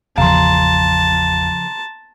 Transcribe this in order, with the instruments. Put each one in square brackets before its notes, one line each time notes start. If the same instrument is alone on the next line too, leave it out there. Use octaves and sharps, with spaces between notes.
[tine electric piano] G#1 E2 F5 [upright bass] C#3 F3 [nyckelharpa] A5 [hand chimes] A#5 C6